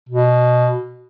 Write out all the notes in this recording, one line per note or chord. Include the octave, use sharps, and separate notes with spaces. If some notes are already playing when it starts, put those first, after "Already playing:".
B2